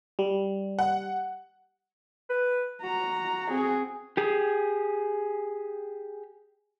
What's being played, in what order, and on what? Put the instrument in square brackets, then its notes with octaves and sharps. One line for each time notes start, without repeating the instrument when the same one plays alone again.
[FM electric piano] G3
[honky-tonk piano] F#5
[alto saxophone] B4
[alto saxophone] F#4 [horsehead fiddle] A#5
[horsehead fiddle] C4 G#4
[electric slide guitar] G4 G#4